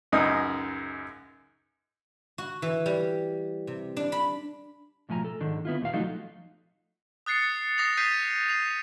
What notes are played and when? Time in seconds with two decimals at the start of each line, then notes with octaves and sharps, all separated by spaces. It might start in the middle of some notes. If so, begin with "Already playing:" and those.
0.12 C#2 F#2 D#4 D#6
2.38 F#4
2.62 E3
2.86 G3
3.67 C3
3.97 D4
4.12 B5
5.09 B1 A2 F3 G#5 A#5
5.25 A4
5.40 G#2 D3 D#3
5.65 B3 E4 F4
5.82 D#2 A#2 F5
5.93 F3 F#3 A3 D#4 F4 F#4
7.26 D#6 F#6 A6 C7 C#7
7.78 D#6 A#6 C7 F7
7.97 D#6 G6 A6 B6 C7 D#7
8.48 C7 F7